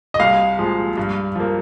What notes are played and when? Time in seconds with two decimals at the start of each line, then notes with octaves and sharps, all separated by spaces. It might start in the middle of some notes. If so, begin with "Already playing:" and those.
0.14 D#5
0.19 C2 F5
0.59 A#2 F3 G#3
0.97 G2
1.35 F3 A#3